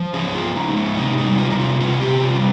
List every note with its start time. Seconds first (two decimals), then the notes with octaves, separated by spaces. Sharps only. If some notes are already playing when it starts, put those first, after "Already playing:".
Already playing: F3
0.14 C#4 G#4
0.34 F4
0.41 F3
0.55 D#4
0.69 G#3
0.76 C#4
0.97 C3 D#4
1.18 D#4
1.25 G3
1.38 F4
1.50 C3 D#4
1.59 F4
1.81 C#4 F4
2.01 G4
2.08 C3
2.22 F4
2.36 G3